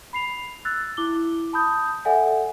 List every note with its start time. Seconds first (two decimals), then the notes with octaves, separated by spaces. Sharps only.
0.13 B5 C7 F7
0.65 E6 F#6 A6
0.97 E4 D6 G7
1.53 A5 B5 D#6 G6
2.05 A4 D5 E5 F#5 G#5